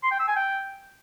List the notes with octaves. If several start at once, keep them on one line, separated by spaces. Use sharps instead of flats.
C6
G5
E6
G#5
G5